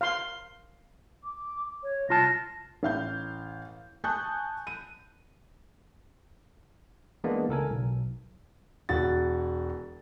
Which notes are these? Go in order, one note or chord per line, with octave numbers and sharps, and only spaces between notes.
F5 C6
D6
C#5
C2 F4 A5 A#6
A1 F5 G6
G#5 A5 C#6 D#6 F#6 G6
D#7
E3 G#3 A#3 B3 D4
C#2 A4 A#4 G#5
B1
E1 F#4 A6